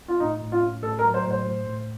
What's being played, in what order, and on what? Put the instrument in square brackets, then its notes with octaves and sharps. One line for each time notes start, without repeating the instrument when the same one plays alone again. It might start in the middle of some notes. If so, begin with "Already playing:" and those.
[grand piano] F4
[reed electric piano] A2 [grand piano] D#4
[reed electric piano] A2
[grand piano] F4
[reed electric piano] C#4
[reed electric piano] A2 [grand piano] A4
[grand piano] A#4
[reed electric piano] F#3
[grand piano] C5
[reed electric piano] A2 [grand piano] C5
[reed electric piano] A2
A2